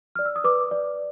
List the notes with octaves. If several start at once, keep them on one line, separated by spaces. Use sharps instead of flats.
D5 F6
E6
D#6
B4 D6
D5